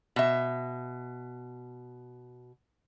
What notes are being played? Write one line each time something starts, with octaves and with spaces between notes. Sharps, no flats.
B2 E5